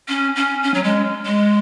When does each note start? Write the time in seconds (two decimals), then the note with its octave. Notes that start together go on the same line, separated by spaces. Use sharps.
0.09 C#4
0.36 C#4
0.63 C#4
0.74 F#3
0.83 G#3
1.25 G#3